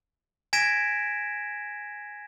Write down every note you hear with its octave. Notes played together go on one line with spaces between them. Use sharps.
G#5 G#6 A#6 B6 D7 E7